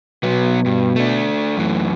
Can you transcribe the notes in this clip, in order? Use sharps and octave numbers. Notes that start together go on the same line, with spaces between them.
B2 F#3 B3
G2
A3 D4
F#2 E3 A3